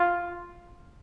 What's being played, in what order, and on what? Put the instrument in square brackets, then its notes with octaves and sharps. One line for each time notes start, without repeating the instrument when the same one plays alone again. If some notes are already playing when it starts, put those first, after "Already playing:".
Already playing: [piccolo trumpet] F4